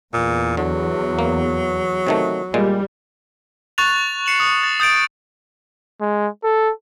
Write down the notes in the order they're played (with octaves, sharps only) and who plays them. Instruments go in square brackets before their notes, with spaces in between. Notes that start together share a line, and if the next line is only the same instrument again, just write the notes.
[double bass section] E2 [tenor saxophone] A#2
[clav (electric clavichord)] D3 [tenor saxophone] F#3
[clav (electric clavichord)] A#3
C3 D#3 A3
[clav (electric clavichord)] A#2 G#3 [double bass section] G3
[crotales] C#6 F#6 A6 F7
C7 C#7 E7 F#7
D#6
A6
D#6 G6 A6 D7
[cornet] G#3
A4